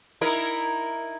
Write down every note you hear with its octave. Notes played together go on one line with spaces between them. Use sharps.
D#4 E4 A#4